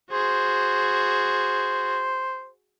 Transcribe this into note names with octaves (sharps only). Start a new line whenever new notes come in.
F#4 G#4 C5